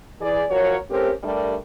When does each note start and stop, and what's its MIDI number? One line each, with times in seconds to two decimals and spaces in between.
0.21 0.43 52
0.21 0.43 68
0.21 0.43 74
0.51 0.76 53
0.51 0.76 66
0.51 0.76 70
0.51 0.76 73
0.90 1.10 57
0.90 1.10 60
0.90 1.10 61
0.90 1.10 67
0.90 1.10 70
0.90 1.10 72
1.23 1.56 43
1.23 1.56 55
1.23 1.56 57
1.23 1.56 62
1.23 1.56 70